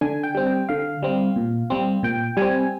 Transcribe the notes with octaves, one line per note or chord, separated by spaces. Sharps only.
D3 G#5
G5
G3 C4
G5
D3 F5
G3 C4
A#2
G3 C4
A#2 G5
G3 C4 G#5